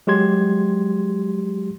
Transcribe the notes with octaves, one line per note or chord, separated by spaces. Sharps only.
F#3 G#3 G4 C6 G#6